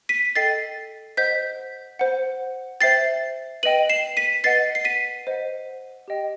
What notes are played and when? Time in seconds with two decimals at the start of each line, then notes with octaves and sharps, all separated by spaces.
0.09 B6 D#7
0.36 A4 D#5 G5 A6 C7
1.17 C5 D#5 F#5 G6 B6
1.99 C5 F#5
2.81 C5 E5 G5 A6 C7
3.63 B4 D#5 G5 D#7 F#7
3.89 C7 E7
4.17 B6 D#7
4.44 B4 D#5 F#5 A6 C7
4.75 C7
4.85 B6 D#7
5.27 C5 D#5 F#5
6.08 G4 D#5 G5